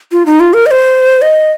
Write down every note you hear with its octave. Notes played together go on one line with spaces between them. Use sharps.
F4
D#4
F4
A#4
D#5
C5
D#5